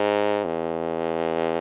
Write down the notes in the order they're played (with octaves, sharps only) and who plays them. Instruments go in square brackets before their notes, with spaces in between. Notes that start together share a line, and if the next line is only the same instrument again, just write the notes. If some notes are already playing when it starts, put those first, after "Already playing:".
Already playing: [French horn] G#2
E2